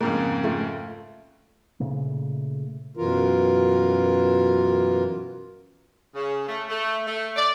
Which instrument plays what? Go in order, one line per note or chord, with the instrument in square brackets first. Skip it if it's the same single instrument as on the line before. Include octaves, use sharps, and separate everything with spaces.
[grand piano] F2 G#2 C#3 [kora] A#3
[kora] A3 F4
[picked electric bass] A#2 C#3 A3
[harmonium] F#2 B2 E3 F4 A#4
[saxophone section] C#3
A3
A3
A3
D5